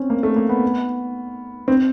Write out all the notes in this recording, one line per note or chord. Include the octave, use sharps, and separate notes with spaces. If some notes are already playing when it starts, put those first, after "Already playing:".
Already playing: C4 C#4
A#3
A3
A#3
B3
C4